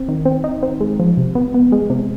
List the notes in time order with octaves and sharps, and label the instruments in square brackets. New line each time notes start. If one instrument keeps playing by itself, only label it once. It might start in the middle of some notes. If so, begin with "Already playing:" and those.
Already playing: [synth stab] C4
D#3
C4
D#4
C4
G#3
F3
C3
B3
B3
G#3
C3